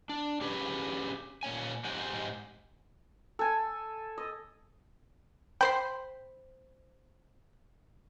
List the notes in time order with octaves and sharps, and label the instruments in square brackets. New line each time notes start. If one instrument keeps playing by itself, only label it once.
[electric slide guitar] D4
C#4 G4 G#4 B4
A#2 C#5 G#5
G#2 D#4 G4 C5 F#5 G#5
[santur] A4 G#5
D#5
[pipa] C5 B5 [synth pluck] G5 C6